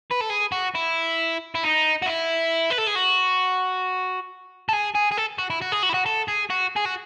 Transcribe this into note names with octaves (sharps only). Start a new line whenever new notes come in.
B4
A4
G#4
F#4
E4
E4
D#4
F#4
E4
B4
A4
G#4
F#4
A4
G#4
G#4
G#4
A4
F#4
E4
F#4
G#4
F#4
E4
F#4
A4
G#4
F#4
G#4
F#4